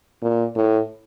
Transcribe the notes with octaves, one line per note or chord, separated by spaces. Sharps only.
A#2
A2